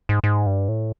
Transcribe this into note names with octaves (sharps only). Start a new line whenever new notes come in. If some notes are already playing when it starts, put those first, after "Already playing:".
G#2
G#2
G2
A2